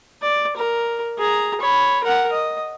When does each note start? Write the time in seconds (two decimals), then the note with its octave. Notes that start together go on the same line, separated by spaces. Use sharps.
0.22 D5
0.56 A#4
1.18 G#4 A#5
1.60 C#5 B5
2.03 A#4 F#5
2.32 D#5